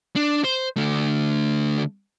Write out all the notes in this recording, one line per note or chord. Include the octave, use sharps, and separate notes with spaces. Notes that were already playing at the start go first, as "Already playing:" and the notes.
D4
C5
D3 A3